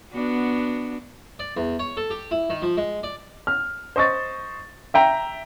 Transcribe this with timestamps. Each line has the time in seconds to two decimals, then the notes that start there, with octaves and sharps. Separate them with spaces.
0.12 B3 D4 F#4
1.39 D5
1.57 E2
1.79 C#5
1.97 A4
2.11 G4
2.31 E4
2.50 D#3
2.62 F3
2.77 G#3
3.03 D5
3.47 F6
3.96 C5 D#5 C#6 A6
4.94 E5 G5 A#5